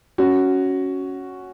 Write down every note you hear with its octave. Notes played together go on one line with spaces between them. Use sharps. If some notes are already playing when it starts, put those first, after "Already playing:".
C#4 F#4